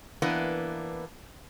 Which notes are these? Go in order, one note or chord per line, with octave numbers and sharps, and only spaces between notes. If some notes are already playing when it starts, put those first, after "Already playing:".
E3 A#3 B3 D4